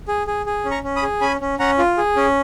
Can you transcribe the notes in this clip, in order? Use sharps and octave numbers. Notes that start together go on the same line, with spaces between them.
G#4
G#4
G#4
C#4
A#5 C#6
C#4
B5 D#6
G#4
C#4 G#5 B5
C#4
C#4 F#5 A#5
F4
G#4
C#4